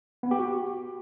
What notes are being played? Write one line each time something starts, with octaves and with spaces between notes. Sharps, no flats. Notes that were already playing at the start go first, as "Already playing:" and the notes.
B3
G4
F#4